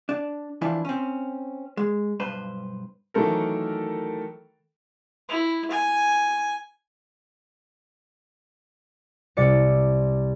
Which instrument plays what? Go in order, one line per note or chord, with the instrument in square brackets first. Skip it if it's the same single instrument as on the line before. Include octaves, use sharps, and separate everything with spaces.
[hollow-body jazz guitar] D4
E3 F3 D4 E4
C4 C#4
G#3
B1 G2 B4 C5
[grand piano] D#3 E3 F#3 A3 A4 A#4
[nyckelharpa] E4
G#5
[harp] C2 C3 D5 C#7